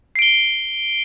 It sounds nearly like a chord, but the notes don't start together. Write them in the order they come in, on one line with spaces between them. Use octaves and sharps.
C7 D7 G7